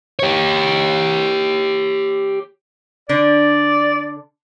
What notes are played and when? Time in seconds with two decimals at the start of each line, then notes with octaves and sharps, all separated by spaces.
0.19 G4 C#5
3.09 D3 D4 D5